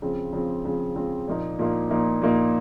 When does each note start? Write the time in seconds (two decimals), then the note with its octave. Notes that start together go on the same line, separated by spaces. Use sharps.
0.02 C#3 F3 C4
0.33 C#3 F3 C4
0.65 C#3 F3 C4
0.95 C#3 F3 C4
1.28 A#2 F3 A#3 D#4
1.59 A#2 F3 A#3 D#4
1.91 A#2 F3 A#3 D#4
2.22 A#2 F3 A#3 D#4